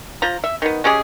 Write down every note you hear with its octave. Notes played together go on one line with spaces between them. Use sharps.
F3 A#5
E5
D#3 B3
G#3 C#4 G4 G#4